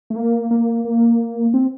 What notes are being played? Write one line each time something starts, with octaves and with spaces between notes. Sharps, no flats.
A3
A#3
A#3
A#3
C4